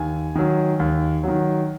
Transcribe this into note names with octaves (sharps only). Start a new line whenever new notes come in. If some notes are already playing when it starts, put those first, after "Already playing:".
Already playing: D#2 G#5
D#3 F#3
D#2
D#3 F#3